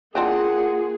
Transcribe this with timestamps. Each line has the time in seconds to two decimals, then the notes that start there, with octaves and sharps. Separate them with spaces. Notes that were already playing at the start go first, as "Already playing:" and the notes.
0.15 E3 A#3 C4 D4 F4 G#4 F#5